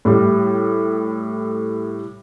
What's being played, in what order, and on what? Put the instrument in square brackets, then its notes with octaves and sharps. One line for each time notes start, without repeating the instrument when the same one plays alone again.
[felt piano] A2 G3